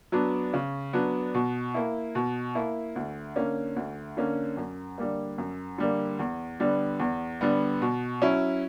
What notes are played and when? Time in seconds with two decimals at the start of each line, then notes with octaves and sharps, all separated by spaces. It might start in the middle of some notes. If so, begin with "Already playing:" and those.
0.12 F#3 B3 D4
0.54 C#3
0.93 F#3 B3 D4
1.35 B2
1.74 A#3 E4
2.15 B2
2.55 A#3 E4
2.96 D2
3.36 D3 A#3 C#4
3.76 D2
4.17 D3 A#3 C#4
4.57 F#2
4.98 D3 G3 A#3
5.38 F#2
5.78 D3 G3 A#3
6.19 E2
6.60 D3 G3 B3
7.00 E2
7.41 D3 G3 B3
7.82 B2
8.22 F#3 C#4 E4